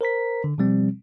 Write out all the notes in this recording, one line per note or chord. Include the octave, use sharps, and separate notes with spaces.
A#4 C5 A#5 B6
D3
B2 F3 G3 C4